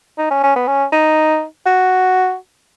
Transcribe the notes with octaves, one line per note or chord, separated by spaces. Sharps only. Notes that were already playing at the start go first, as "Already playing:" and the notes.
D#4
C#4
C#4
B3
C#4
D#4
F#4